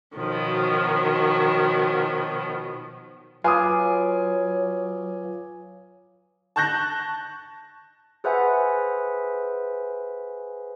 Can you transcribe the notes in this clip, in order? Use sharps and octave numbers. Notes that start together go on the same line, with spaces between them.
B2 D#3 F3 F#3
F#3 F4 B4 F5 G#5 D6 D#6
A5 C#6 F#6 G6 A#6
G#4 B4 C5 E5 F#5 G#5